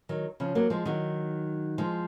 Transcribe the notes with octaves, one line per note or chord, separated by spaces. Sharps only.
D#3 F#3
C#3 F3
F#3 A#3
F3 G#3
D#3 F#3
F3 G#3